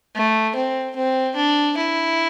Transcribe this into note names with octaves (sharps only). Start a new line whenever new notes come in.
A3
C4
C4
D4
E4